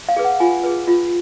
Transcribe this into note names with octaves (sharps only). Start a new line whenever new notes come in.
F5
G#4 B4
F#5
F4 G#5
G#4 B4
F4